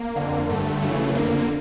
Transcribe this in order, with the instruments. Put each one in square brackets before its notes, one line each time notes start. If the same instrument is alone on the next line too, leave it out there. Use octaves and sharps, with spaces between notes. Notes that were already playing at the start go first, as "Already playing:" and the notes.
Already playing: [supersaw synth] A#3
F2 D3
G2 D3 A3
F#2 C#3 E3
F2 D3 A#3